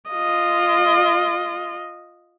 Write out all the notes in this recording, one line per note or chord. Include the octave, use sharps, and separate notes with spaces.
F4 D#5